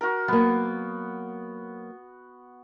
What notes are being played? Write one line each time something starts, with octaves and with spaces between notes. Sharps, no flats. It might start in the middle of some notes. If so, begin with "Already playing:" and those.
F#4 A#4
F#3 A#3 B3